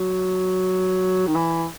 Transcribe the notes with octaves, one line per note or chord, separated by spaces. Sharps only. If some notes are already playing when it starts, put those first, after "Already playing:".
Already playing: F#3
D#3
E3